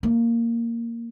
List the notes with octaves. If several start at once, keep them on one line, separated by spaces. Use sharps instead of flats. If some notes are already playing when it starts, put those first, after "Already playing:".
A#3